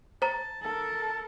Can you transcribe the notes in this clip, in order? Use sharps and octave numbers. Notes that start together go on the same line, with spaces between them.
C5 A5 A#5
A4 A#4 A5